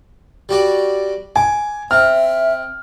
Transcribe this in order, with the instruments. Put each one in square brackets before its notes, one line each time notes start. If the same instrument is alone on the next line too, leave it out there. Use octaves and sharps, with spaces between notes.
[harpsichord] G3 F#4 D5
[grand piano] G#5 [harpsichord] D6
[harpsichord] C4 [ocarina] E5 [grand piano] F6